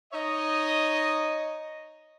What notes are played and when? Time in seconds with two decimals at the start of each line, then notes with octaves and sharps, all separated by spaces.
0.13 D#4 C#5 D#5